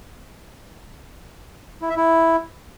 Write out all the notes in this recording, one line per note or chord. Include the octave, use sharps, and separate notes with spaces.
E4
E5
E4